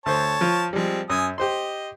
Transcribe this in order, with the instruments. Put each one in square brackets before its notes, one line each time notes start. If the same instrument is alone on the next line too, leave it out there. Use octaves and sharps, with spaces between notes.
[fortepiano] D2 C5 [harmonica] C#5 A5
[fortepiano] F3 F4
[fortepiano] F3 G3 [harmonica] G#3 C4
[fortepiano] F#2 [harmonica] G#5 D#6 E6
[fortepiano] G4 C5 C6 [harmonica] D#5